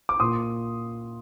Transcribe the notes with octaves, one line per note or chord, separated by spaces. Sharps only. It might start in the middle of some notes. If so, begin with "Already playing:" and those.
D6
A#2 C6 D#6